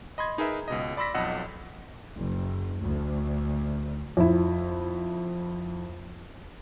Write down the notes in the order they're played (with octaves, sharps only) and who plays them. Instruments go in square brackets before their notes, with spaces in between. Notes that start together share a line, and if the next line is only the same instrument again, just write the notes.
[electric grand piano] D#5 B5 C6 G#6
D#4 G#4 A#4 B4 E5
C#2 B2 D#5
D5 B5 C6 E6 A#6 B6
B1 F2 D#5 F#5 E6
[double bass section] F#1
D2
[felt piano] F2 E4